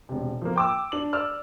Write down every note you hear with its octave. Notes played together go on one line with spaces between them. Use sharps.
E1 C3
F3 A#3
G5 D6 E6
D4 F#7
D5 E6 F6